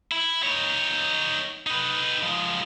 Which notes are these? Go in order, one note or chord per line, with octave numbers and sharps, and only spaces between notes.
E4
D#4 C#5
D#4 B4
F3 G#3